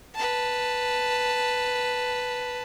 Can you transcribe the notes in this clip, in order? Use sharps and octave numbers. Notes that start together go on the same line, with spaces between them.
B4 A5